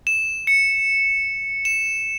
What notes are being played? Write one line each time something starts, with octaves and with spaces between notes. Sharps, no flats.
E7
C#7
E7